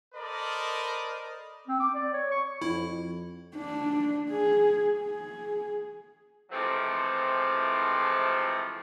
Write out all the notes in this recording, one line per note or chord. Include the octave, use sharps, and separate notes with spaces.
A4 A#4 C5 D5 D#5 B5
C4
D6
D5
C#5
C#6
F2 E4
D4
G#4
G#4
C3 E3 F3 G#3 A3 C4